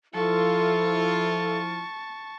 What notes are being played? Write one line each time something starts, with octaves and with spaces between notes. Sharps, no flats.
F3 E4 F4 A4 A5 C#6